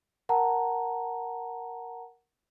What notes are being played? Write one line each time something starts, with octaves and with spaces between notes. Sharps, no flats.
A#4 F#5 A5 A#5